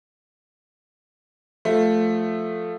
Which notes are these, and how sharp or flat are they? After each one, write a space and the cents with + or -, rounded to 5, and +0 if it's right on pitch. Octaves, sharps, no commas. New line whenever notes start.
F3 +10 A3 +0